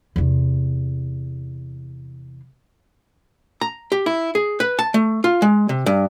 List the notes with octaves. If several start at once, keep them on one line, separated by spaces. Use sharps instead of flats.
E2 C3
A#5
G4
E4
G#4
B4
A5
A3
F4
G#3
C3
G2